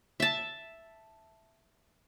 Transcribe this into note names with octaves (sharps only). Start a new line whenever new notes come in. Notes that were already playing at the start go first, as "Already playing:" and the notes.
E5 A5